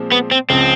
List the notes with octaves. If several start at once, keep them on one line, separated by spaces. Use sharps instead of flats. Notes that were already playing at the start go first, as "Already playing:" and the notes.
Already playing: A#2 F3 G#3 C4
B3
C4
C#2 C#3 F3 C4